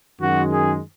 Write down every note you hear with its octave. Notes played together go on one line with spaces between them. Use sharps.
F#2 D#3 G#3 F#4
G#4